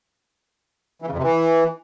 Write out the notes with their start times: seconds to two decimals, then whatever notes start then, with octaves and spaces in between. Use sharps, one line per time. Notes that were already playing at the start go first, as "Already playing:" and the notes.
1.02 E3
1.07 C#3
1.12 F2
1.17 C3
1.23 E3